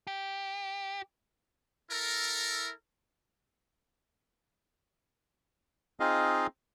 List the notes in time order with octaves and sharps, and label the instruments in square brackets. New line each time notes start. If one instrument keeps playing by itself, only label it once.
[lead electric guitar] G4
[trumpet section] E4 A4 A#4
[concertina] C4 D#4 F4 G#4 D#5 F5